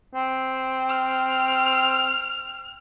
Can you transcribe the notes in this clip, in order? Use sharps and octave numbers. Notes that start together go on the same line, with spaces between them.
C4
F6